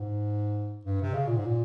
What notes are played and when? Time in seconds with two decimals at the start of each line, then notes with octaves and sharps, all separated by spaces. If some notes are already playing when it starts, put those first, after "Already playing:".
Already playing: G#2
0.85 G2
1.02 C3
1.14 C#3
1.27 A#2
1.37 G#2
1.45 A#2